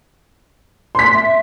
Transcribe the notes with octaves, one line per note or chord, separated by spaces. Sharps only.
C6 B6
E5